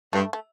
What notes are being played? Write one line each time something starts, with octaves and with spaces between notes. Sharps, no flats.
G2 A3
A3